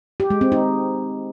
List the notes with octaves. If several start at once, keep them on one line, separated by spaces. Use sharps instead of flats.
G4
G#3
C4
D#4